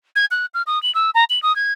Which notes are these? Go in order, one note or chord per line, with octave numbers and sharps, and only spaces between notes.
G#6
F#6
F6
D#6
F#7
E6
A#5
F#7
D#6
G#6